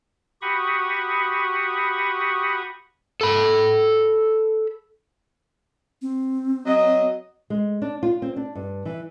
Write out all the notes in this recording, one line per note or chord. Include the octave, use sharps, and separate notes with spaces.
F#4 G4 B5 C#6 D#6
A4 B5
C4
F#3 D#5
G#3
D4
F4
C4
D4
G2
E3